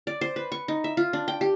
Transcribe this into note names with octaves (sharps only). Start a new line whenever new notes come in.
D5
C5
B4
C#6
D#4
E5
F4
D4
G5
G4